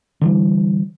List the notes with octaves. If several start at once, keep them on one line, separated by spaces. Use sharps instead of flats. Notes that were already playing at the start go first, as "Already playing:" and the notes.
D3 E3 G3